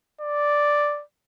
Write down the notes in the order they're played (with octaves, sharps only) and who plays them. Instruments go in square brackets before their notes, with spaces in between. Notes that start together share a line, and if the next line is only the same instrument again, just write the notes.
[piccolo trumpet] D5